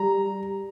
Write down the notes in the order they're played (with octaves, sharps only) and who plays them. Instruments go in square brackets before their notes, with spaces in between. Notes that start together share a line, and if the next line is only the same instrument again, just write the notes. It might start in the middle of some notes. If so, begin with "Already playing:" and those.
Already playing: [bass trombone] G3 [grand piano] A#5